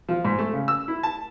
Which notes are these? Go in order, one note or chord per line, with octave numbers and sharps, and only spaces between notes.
F3
G#2
A3
C#3
E6
E4
A5